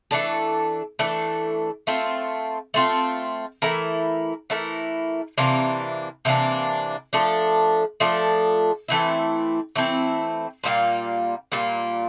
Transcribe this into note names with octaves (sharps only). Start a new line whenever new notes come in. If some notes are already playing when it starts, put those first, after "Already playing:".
E3 A3 D4 A4
E3 A3 D4 A4
A3 C4 F4
A3 C4 F4
E3 A3 E4 A#4
E3 A3 E4 A#4
C3 E3 A#3 D4
C3 E3 A#3 D4
F3 A3 D4 A4
F3 A3 D4 A4
E3 A3 C4 E4
E3 A3 C4 E4
A#2 G3 A#3 F4
A#2 G3 A#3 F4